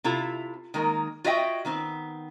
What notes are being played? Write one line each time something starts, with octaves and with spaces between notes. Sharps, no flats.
C3 E4 F4 A4
D#3 G#3 A#3 A#4
F4 F#4 C#5 D#5 E5 G5
D#3 B3 C4